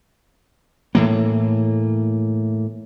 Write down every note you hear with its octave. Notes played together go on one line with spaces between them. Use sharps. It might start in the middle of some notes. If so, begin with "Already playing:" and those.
A2 E3 A#3